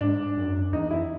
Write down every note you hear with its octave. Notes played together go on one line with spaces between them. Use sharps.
G#2 D4
F#2
E2 D#4
F2 E4